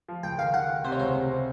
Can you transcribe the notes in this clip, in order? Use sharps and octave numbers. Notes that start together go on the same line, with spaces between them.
F3
C#2 G5
D#3 F5
D#3 F#5
D#3
C3 C5
C#5
C#2 C5
C3
C3